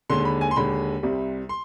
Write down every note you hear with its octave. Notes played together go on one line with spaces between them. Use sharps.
D#2 D3 G#3 C6
B5
G#5
C6
D#2 D3 G#3 B5
C2 C3 G3
C6